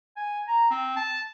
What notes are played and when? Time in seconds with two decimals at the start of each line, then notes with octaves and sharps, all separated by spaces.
0.17 G#5
0.48 A#5
0.71 C4
0.96 A5